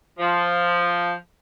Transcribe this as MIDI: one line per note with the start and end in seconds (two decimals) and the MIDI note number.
0.19 1.12 53